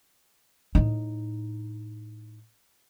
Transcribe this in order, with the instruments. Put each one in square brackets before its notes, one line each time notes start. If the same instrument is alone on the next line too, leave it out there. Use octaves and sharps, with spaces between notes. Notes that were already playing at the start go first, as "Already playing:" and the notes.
[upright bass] A2 D#4